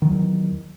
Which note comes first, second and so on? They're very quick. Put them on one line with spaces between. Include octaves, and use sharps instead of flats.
D#3 F#3 E2